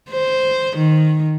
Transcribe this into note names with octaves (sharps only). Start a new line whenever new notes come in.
C5
D#3